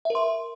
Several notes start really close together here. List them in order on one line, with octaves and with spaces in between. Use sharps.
E5 A#4 C6